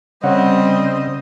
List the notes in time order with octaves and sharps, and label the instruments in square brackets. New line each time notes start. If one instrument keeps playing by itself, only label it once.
[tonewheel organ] C#3 [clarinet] G3 [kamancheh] C4 D#5 [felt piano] C#5 F#5